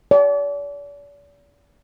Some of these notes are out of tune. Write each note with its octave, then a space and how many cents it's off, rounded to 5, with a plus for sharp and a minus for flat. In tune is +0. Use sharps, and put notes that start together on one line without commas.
D5 -40